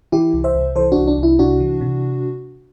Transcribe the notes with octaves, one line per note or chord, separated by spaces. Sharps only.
E3 E4 G4
C2
C5 E5
C2
E3 A4 C5
C2 D4 F#4
D4
C2 E4
C3 D4 F#4
E3
C3